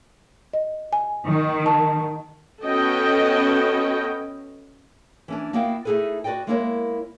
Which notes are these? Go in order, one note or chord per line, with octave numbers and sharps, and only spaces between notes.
D#5
G#5
D#3
A5
B3 C#4 F#4 A4 D#5 G5
E3 C#4 D4
A#3 B3 E4 F#4 F5 G5
A3 D#4 E4 G#4 A4 B4
F#4 B4 D5 D#5 G5
G#3 A#3 B3 E4 A#4 C#5